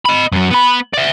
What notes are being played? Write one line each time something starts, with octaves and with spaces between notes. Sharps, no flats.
D#5 B5
F#2 F#3
B3 B5
D5 E5